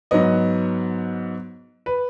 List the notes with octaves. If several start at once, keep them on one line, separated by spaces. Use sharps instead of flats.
G#2 F#3 B3 D#5
B4